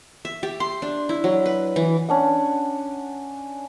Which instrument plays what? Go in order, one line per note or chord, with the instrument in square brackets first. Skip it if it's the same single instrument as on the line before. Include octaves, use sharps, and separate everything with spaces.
[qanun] E5
G4
C6
D4
E4
F#3
B4
E3
[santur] C#4 D4 F#5